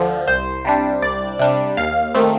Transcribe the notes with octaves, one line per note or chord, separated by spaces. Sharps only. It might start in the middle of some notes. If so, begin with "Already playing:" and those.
Already playing: D2 D3 F3
C2 C5
C3 G3 D4
C2 D5
C3 G3 D4
D#2 F5
D#3 A3 C4